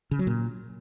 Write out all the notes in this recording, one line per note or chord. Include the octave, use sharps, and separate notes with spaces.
C#3
F#3
A#2